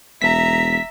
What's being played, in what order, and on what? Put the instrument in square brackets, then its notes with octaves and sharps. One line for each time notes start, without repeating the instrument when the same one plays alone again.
[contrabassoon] E1 [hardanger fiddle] E5 A#5 [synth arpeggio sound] B6